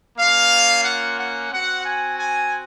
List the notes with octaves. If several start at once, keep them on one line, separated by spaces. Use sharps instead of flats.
A#3 C#4 F4 F5
F#5
F#5
C4 F#4 F#5
G#5
G#5